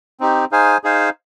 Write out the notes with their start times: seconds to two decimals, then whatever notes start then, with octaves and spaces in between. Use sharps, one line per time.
0.20 C4 D#4 G4
0.51 D#4 G#4 C5 F5 G#5
0.83 D#4 G#4 C5 F5 G#5